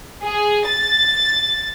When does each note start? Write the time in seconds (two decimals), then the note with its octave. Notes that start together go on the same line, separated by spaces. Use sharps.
0.23 G#4
0.68 A6